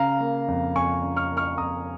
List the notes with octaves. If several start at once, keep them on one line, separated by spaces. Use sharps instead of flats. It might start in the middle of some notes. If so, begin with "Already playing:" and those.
Already playing: C#3 F5 A#5
A#3
F2
F2 G#5 C#6
C#3
C#6 F6
A#3
C#6 F6
F2 A#5 D#6